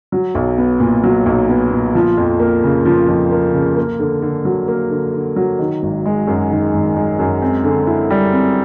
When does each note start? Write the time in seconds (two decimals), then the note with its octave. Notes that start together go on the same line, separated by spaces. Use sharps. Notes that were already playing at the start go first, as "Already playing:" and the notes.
0.12 F#3
0.35 B1
0.58 B3
0.80 A#2
1.03 F#3
1.26 B1
1.49 B3
1.71 A#2
1.95 F3
2.17 F2
2.40 A#3
2.63 C#3
2.85 F3
3.08 F2
3.31 A#3
3.54 C#3
3.77 A#3
3.99 D3
4.22 D3
4.45 F#3
4.68 A#3
4.91 D3
5.14 D3
5.36 F#3
5.59 D#3
5.83 G#1
6.06 G#3
6.27 F#2
6.51 D#3
6.74 G#1
6.96 G#3
7.19 F#2
7.42 C4
7.64 D3
7.87 E4
8.10 G3
8.33 C4